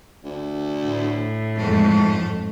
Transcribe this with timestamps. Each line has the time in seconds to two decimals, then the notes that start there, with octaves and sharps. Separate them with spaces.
0.24 D2
0.84 A2
1.58 F2 G#2 A3